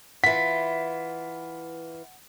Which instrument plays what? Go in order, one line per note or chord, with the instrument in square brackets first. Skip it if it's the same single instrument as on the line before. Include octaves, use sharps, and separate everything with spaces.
[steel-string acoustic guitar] E3 F4 [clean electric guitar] F#5 [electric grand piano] B6